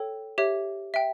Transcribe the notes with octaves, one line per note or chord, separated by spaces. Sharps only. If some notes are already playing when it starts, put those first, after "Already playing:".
Already playing: A4 C#5 G5
G4 C#5 E5
E5 G5